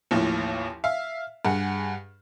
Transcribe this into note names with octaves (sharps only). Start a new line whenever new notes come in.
A1 D#2 E3 F3
E5 F5
G2 G#4 F#5